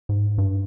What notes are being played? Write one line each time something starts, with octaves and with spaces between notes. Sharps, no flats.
G#2
G2